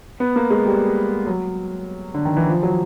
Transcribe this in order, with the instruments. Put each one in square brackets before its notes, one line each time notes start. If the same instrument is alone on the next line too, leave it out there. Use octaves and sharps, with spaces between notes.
[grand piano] B3
A#3
G#3
G3
F#3
D3
D#3
E3
F3
F#3